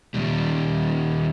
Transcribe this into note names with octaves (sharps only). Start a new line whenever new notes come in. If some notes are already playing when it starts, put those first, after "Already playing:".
D#2 G3